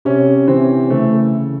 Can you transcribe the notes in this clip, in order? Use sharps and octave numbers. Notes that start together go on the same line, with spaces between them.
C3 C#4
E3 C4
C#3 A3